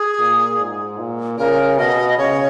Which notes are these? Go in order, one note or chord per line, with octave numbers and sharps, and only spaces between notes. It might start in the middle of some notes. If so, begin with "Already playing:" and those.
Already playing: G#4
A#2
G#2
A#2
C#3 A#4
B2 D#5
C#3 C#5